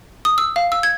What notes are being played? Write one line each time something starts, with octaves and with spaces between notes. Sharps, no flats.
D#6
E6
F5
E6
G#6